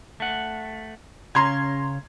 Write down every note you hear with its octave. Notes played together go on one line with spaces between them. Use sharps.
A3 F#5
C#3 C#4 A#5 C6 G#6